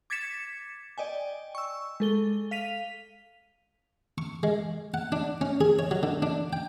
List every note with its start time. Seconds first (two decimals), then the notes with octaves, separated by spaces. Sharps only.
0.10 D6 G#6 A6 B6 C#7 E7
0.98 D5 D#5 G5 G#5
1.55 C#6 E6
2.00 G#3 A4 G7
2.51 F5 B6 D#7 F7
4.18 C#6
4.43 G#3
4.94 F#5
5.12 D4
5.41 C#4
5.61 G#4
5.79 C#5
5.91 F#3
6.03 D3
6.22 D4
6.53 G5